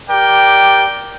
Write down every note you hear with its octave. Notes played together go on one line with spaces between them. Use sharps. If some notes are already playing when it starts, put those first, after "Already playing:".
G4 A#4 D5 G5